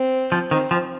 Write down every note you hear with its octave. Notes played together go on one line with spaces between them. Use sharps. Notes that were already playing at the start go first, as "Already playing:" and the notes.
Already playing: C4
F3
D#3 C4
F3